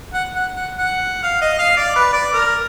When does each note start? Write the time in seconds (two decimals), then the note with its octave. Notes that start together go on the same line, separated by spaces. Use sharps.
0.13 F#5
0.35 F#5
0.56 F#5
0.78 F#5
1.23 F5
1.41 D#5
1.59 F5
1.77 D5
1.96 B4
2.13 D5
2.33 A#4